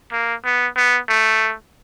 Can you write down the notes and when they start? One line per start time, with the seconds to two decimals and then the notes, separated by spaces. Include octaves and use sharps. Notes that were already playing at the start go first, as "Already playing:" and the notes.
0.12 A#3
0.45 B3
0.77 B3
1.09 A3